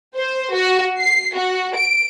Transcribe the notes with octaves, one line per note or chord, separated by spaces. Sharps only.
C5
F#4
C7
F#4
D7